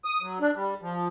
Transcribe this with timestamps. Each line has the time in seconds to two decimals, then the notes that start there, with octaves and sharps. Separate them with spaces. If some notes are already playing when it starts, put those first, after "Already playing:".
0.05 D#6
0.22 F#3
0.40 D4
0.56 G3
0.82 F3